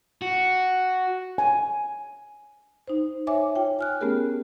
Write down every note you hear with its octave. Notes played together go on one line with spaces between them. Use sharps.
F#4
G#5
D#4 C5
C#5 E5 G#5 D6
F4 C#5 G5
G#5 F6 F#6
A3 B3 C#4 G4 G#4 A#4